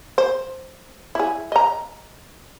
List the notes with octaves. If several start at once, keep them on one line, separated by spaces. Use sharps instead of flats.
C5
E4 G#4
D#5 A#5